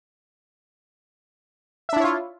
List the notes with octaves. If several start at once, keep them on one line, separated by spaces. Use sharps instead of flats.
D4 E4 F4 C#5 E5